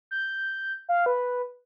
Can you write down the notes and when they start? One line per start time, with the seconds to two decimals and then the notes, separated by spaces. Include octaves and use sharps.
0.11 G6
0.89 F5
1.06 B4